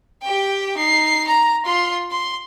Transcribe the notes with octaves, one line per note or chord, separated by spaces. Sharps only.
G4 G5
D#4 C7
A#5
F4 C6
C6